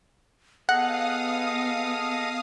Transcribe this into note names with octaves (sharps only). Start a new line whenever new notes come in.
B3 G#4 A4 D#5 F5 F#5 D#6